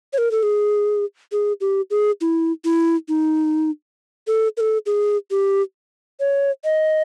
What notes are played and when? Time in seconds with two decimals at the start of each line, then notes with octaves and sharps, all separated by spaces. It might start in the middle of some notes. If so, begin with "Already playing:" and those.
0.13 C#5
0.18 A#4
0.31 A4
0.43 G#4
1.32 G#4
1.61 G4
1.90 G#4
2.21 E4
2.65 E4
3.08 D#4
4.27 A4
4.57 A#4
4.61 A4
4.86 G#4
5.31 G4
6.20 C#5
6.64 D#5